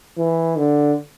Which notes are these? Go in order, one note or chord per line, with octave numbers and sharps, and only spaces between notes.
E3
D3